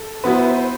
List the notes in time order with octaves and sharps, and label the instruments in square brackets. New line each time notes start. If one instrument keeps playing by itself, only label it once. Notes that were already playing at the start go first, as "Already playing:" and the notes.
Already playing: [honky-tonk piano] A4
[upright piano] F#3 B3 E4 [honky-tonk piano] B4
[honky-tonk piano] C5
B4
C5